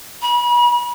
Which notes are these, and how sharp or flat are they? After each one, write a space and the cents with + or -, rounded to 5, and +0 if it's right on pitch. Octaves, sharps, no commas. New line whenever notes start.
B5 -35